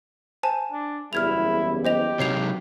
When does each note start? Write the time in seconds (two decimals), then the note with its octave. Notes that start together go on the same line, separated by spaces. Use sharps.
0.43 C5 G#5 A5
0.72 D4
1.13 F#1 E2 G3 E4 F6 G#6 F7
1.85 G4 C5 D#5 F7
2.19 C3 F#3 C#5 C7 F7